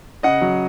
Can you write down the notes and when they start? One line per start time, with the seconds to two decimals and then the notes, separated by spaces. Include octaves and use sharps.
0.23 C#3 D#5 F#5
0.41 F#3